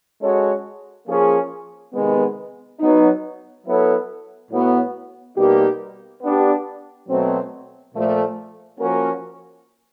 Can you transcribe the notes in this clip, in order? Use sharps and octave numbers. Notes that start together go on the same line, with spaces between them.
G#3 C#4 F#4 A4 C#5
F3 A#3 C#4 F4 G#4
C3 D#3 G#3 B3
F#3 B3 D#4
F#3 B3 E4 A4 C#5
A2 F#3 B3
B2 G3 A#3 D#4 G4
B3 D4 G4
B2 F#3 A3 C4
A#2 F3 A3
F3 A#3 C#4 F#4 A#4